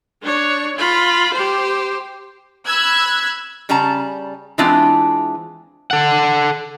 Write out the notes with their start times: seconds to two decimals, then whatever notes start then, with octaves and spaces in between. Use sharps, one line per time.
0.22 D4 C#5
0.76 F4 B5
1.34 G4 C5
2.65 B5 E6 F#6 G#6
3.69 C#3 G3 C#4 A5 A#5
4.58 E3 G#3 C4 D4 E4 F4
5.91 A4 F#5